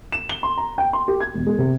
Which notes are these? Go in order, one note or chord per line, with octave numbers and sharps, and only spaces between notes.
E7
G7
C6
A#5
G5
C6
G4
G#6
E1
G#3
C3